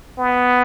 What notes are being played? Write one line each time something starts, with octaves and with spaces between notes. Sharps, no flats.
B3